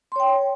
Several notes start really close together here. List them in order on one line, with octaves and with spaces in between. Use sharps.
C6 C#5 G5